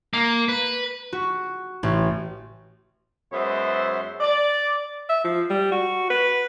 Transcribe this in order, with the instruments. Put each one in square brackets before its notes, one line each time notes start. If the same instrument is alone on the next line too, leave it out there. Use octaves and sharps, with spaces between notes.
[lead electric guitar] A#3
B4
[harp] F#4
A1
[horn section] F#2 G#3 B3 C5 E5
D5
[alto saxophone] E5
F3
G3
F#4
B4